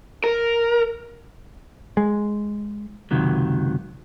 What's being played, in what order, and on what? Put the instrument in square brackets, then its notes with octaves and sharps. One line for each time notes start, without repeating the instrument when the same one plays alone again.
[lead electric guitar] A#4
[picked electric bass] G#3
[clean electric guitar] C#2 F#2 C3 D#3 F#3